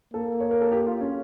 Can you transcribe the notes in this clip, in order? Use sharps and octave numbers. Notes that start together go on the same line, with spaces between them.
A#3 A4
C#5
A#4
A4
G4
F4
C#4